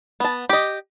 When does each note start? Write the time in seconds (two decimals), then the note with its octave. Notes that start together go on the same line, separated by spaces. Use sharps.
0.20 B3 A5
0.49 G4 D#5